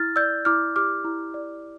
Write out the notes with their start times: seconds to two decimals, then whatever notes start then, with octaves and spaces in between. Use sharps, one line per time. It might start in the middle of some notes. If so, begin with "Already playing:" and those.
Already playing: E4 F6 A6
0.16 D5 E6 G6
0.45 E4 D6 F6
0.76 G4 D6 F6
1.05 E4
1.34 D5